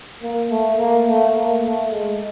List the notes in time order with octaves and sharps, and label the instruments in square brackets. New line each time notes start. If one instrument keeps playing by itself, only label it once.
[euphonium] A#3
A3
A#3
A3
A#3
A3
G#3